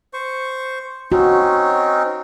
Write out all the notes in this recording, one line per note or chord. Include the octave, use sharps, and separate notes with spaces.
C5 C#6
C4 C#4 D#4 F#4